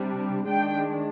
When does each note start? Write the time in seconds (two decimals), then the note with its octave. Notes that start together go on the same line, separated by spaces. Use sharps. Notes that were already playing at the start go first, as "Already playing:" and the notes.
Already playing: C3 G3 D4
0.47 D#3 G#3 D4 G5